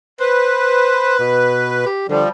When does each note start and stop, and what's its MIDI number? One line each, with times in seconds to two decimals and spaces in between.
0.20 1.85 71
0.20 1.17 72
1.19 1.85 47
1.86 2.08 67
2.09 2.23 50
2.09 2.29 53
2.09 2.29 55